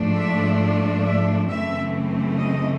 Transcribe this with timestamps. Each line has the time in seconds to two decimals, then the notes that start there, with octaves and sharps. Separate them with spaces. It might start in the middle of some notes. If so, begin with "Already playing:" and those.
Already playing: G#2 F3 A3 D4
0.17 E5
1.05 E5
1.50 F#2 C#3 E3 A3 C4 E5
2.38 D#5